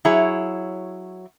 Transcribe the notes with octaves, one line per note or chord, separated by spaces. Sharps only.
F#3 E4 G#4 C#5